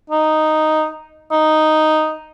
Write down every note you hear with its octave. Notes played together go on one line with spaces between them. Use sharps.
D#4
D#4